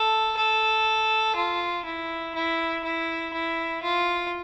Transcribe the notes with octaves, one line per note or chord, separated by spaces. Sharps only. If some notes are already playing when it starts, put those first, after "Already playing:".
Already playing: A4
A4
F4
E4
E4
E4
E4
F4